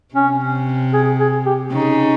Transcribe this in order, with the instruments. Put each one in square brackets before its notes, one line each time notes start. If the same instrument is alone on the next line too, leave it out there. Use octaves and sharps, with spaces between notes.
[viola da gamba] C3 [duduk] C#4
[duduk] G#4
G#4
G4
[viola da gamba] C#3 [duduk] D#4